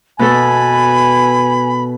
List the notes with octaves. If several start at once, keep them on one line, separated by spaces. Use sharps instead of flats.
B2 B3 A4 G#5 B5